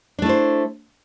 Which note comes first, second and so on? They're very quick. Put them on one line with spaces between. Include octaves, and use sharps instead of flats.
D4 A3 E4 C5